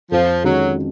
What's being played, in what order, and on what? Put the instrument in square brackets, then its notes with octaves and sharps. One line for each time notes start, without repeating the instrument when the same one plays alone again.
[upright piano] F2 [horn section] F3
[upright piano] D#3 G#3 C#4 F#4 [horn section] F#3